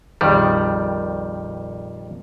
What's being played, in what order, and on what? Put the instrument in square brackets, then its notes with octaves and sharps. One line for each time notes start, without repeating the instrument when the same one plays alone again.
[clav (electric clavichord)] A#1 F2 D#3 G3